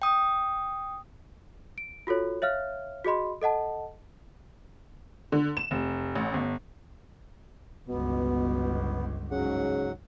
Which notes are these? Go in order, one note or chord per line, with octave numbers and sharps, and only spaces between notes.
G5 D#6
D7
F4 F#4 A4 C#5
C#5 E5 F5 F6
F#4 G#4 D#5 B5 C6
A4 D#5 F#5 A5
D3
E7
F1
A1
G1
G1 C#2 B2 B3
G#2 C#3 F#3 F#5